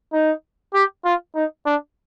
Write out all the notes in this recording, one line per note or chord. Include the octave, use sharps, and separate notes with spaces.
D#4
G4
F4
D#4
D4